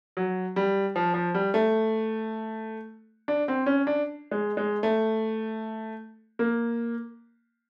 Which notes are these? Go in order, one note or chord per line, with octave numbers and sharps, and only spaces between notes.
F#3
G3
F3
F3
G3
A3
D4
C4
C#4
D4
G#3
G#3
A3
A#3